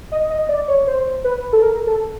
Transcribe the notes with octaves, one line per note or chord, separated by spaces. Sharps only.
D#5
D#5
D5
C#5
C5
B4
A4
A#4
A4